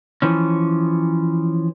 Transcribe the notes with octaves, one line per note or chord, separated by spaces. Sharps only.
E3 F3 C#4